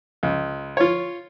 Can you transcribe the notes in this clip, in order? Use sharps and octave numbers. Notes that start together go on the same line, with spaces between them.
C#2
F4 C#5